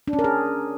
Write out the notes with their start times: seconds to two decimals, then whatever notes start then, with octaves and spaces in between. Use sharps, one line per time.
0.08 D4
0.13 C#4
0.19 A#4
0.24 G#4